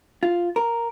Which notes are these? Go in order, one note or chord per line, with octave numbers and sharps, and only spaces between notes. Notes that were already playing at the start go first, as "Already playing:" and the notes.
F4
A#4